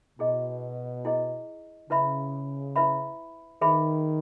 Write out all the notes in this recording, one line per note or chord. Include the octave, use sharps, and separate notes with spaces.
B2 E4 G#4 D#5
E4 G#4 D#5
C#3 E4 B4 E5 B5
E4 B4 E5 B5
D#3 G#4 B4 E5 B5